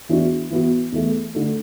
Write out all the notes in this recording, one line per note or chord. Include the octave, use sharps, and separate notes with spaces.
E2 E3 B3 D4 F#4
E3 B3 F#4
E2 E3 A3
D3 A3